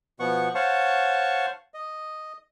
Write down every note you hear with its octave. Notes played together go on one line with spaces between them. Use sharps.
B2 F3 B3 F#5 C#6
C5 C#5 F5 F#5 A5 C#6
D#5